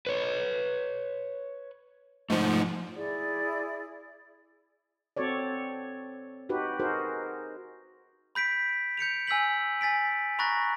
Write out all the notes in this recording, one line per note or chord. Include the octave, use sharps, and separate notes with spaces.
B4 C#5
G#2 F3 A3 D#4 F#5
E4 G#4 D5
C4 F#4 A4 C#5 D5
D#4 F#4 G4 B4
D#4 F#4 G#4 A#4 C5
B5 G6 B6 D7
G6 C#7 D7 F7
G#5 E6 G6 B6 F#7
G#5 A6 B6 D7
A#5 B5 C#6 F#6 A6 A#6